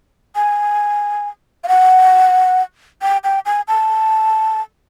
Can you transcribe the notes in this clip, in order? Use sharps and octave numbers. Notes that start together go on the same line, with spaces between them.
G#5
F5
F#5
G5
G5
G#5
A5